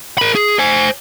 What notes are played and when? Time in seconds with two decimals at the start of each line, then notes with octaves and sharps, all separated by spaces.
0.18 A#4 B5
0.35 G#4
0.59 C5 G#5